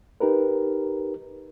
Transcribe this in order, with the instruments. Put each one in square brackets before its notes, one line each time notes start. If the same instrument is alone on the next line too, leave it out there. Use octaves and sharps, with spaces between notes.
[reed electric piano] D#4 G4 A#4 B4